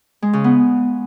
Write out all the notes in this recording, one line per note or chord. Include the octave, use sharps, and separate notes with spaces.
G#3
C#3
B3